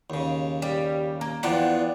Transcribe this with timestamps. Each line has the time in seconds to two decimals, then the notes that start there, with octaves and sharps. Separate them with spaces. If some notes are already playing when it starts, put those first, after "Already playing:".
0.10 D#2 C#3
0.62 G3
1.21 A#3
1.43 E2 F3 B3 D4 F#5 G5